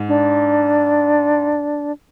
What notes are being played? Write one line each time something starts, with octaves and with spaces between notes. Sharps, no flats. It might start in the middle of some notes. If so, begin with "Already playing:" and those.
Already playing: G#2
D4